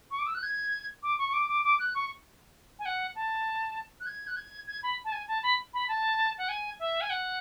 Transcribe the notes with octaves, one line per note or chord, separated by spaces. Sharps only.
C#6
D6
E6
F#6
G#6
D6
C#6
C#6
D6
D6
D6
F#6
C#6
G#5
F#5
A5
F#6
G#6
F#6
G#6
G#6
B5
A5
G#5
A5
B5
B5
A5
F#5
G#5
E5
G#5
F#5